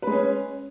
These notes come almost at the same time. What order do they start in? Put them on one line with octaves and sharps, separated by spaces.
B4 G#3 C#4